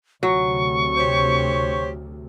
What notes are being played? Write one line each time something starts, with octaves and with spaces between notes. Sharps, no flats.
D2 C3 F#3 C#6
G4 C5 C#5